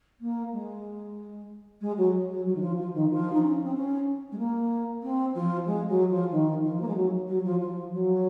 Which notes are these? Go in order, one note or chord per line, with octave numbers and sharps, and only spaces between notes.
A#3
G#3
G#3
F#3
F#3
F#3
D#3
F3
F3
D#3
F3
D#4
C#4
C4
C#4
G#3
A#3
C4
F3
G#3
F#3
F3
D#3
F3
A#3
G#3
F#3
F#3
F3
F3
F#3